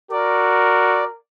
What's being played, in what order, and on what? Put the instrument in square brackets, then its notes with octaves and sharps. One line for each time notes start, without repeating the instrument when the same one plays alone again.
[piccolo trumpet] F#4 [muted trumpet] A#4 [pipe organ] D5